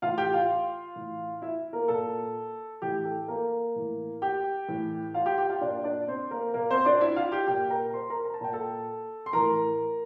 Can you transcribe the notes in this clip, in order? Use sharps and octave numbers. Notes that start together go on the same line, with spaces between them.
A2 E3 F4 F5
G4 G5
F4 F5
A2 E3
E4 E5
A#3 A#4
A#2 A4
A2 E3 G4
A4
A#3 A#4
A2 E3
G4 G5
A2 E3
F4 F5
G4 G5
G4 G5
F4 F5
A#2 D4 D5
D4 D5
C4 C5
A#3 A#4
A#2 A#3 A#4
C4 C5
D4 D5
E4 E5
F4 F5
G4 G5
A#2 G4 G5
A#4 A#5
C5 C6
A#4 A#5
A#5
A5
A#2 G5
A4 A5
C6
A2 E3 A#4 A#5